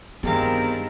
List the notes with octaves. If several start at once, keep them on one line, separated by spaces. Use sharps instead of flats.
G2 D#3 G#3 B3 C4 G4 A#4 F5